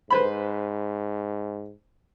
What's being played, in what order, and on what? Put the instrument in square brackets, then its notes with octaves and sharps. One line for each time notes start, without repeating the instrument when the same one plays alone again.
[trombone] G#2 [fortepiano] B4 C5 B5